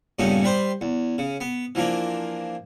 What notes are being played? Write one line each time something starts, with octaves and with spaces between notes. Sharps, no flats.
G2 A#2 C#3 A3 B3 D#4
G3 B4 C5 C6
E2
C#3
B3
E3 F3 A#3 D4